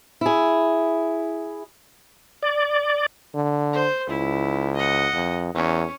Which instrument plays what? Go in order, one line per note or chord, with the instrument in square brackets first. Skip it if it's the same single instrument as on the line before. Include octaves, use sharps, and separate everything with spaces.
[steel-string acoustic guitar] E4 G#4
[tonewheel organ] D5
[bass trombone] D3
[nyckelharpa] C5
[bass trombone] C#2 [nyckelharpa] E4
[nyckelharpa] D#5 F#5
[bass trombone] F2
[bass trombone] E2 [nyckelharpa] C#4